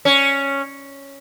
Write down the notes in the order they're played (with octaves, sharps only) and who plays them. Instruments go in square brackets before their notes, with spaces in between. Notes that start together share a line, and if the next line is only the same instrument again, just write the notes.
[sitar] C#4